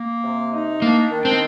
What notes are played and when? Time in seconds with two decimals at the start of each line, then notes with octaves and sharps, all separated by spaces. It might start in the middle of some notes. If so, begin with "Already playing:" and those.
Already playing: A#3
0.23 C3
0.53 D#4
0.82 A#3 D4
1.11 D#3
1.25 C4